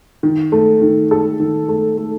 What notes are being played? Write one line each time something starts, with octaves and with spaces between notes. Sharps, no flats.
D#3
A3
D#3
A4
D#3
A3
A3